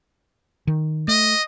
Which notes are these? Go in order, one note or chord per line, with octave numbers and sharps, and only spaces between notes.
D#3
A3 D#5